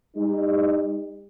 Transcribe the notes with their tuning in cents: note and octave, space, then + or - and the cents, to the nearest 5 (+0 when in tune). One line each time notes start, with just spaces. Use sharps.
G3 +40 D#4 +0